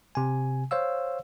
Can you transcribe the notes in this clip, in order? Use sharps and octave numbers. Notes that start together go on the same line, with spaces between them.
C3 G#5
C5 C#5 F5 E6